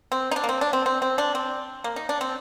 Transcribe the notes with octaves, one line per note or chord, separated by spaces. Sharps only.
C4
D#4
D4
A#3
C4
D4
C4
C4
C4
D4
C4
A#3
D#4
D4
C4